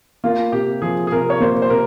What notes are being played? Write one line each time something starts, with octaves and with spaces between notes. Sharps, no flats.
A#3 F4
C3 G4
F3 G#4
G#4
C3 A#4
C#5
A#3 C5
C5
C3 A#4